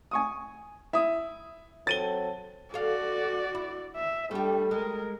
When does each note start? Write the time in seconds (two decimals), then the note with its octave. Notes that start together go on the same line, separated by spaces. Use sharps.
0.11 G#5 C#6 D#6
0.93 E4 E5 D#6
1.87 F#3 C4 A4 A6 D#7 G7
2.74 F#4 A4 D5 F5
3.55 E4
3.96 E5
4.31 G3 A3 D4 G4
4.71 G#3 A#4